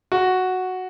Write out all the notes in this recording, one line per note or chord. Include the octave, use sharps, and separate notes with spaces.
F#4